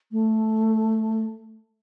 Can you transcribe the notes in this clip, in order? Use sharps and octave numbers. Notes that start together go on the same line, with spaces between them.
A3